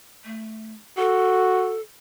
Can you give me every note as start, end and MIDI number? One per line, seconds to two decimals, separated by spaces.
0.25 0.74 57
0.98 1.77 66
0.98 1.81 69